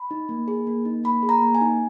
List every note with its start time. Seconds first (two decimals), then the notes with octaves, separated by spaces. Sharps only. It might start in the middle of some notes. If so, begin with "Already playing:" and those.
Already playing: B5
0.11 D#4
0.29 A#3
0.48 G#4
0.67 A#3
0.85 D#4
1.04 A#3 B5
1.23 G#4
1.29 A#5
1.42 A#3
1.55 G#5
1.61 D#4